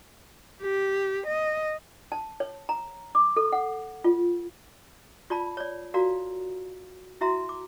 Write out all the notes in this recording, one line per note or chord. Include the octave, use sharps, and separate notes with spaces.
G4
D#5
A5
C#5
A#5
D6
A4
F#5
F4
F4 D5 A5 B5
C#5 D5
F4 F#4 A#4 D5 F5 A#5
E4 F#4 E5 A#5 C6
D6